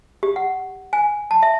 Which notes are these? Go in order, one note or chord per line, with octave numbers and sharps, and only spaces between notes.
G4
F#5
G#5
A5
E5